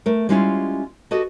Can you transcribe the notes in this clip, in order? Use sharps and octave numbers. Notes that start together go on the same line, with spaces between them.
A3 A#4
G3 G#3 C#4 D4 E4 F4
F#4 G4 A4 B4 D#5